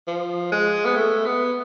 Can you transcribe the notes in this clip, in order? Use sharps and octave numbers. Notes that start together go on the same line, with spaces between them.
F3
G#3
B3
A3
B3